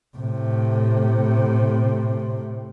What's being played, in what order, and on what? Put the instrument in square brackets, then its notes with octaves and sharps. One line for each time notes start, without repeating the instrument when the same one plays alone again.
[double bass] A2 C3